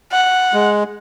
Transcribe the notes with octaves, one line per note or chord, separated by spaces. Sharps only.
F#5
G#3